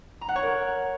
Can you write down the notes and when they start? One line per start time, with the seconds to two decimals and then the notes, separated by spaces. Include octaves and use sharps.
0.21 A#5
0.28 F#5
0.36 C#5
0.43 A#4